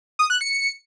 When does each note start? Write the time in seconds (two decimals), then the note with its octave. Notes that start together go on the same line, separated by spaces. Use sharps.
0.19 D#6
0.30 F#6
0.41 C#7